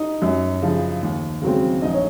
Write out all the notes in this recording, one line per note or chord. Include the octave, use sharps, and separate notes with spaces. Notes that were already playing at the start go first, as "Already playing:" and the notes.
Already playing: D#4 D#5
F#2
C#3 F3
D#2
C#3 F#3 C4
A#1 D#4 D#5
C#5